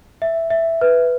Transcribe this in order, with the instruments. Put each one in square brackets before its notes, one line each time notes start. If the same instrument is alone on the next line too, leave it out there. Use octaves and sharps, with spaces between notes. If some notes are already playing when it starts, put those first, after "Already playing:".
[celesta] E5
E5
B4